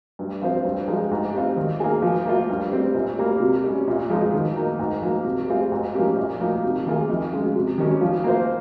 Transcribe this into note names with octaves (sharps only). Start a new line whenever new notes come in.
G2
F3 C4 F4 C5
G2
F3 G#3 D#4
G#2
G3 C4 F4
D#3
A#3 F4 G#4
F3
A#3 F4
G2
G3 C4
A#2
G3 A#3
C3
G3 C#4
A#2
F3 G#3 D#4
D#3
A#3 D#4
G#2
F3 A#3
C3
G3 C4 F4 G#4
G#2
F3 A#3 C#4 G4
A#2
F3 A#3 D#4
C3
D#3 A#3 F4 G#4
F2
C#3 G#3
C3
D#3 G3 C#4 G4
F3
A#3 F4 C5